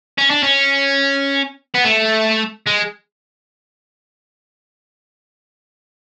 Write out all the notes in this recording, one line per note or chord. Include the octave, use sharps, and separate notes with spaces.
C#4
D4
C#4
B3
A3
G#3